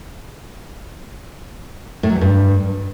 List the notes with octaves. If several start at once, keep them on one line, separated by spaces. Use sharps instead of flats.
A2
F#3
E2
G2